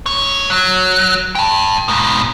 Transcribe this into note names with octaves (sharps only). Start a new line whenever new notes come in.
G2 C#5
F#3
G5 A5
G#2 B2